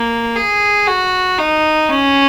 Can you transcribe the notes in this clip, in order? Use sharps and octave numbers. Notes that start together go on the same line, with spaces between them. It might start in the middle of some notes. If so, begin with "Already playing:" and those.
Already playing: A#3
G#4
F#4
D#4
C#4